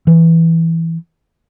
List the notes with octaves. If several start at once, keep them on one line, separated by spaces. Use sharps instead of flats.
E3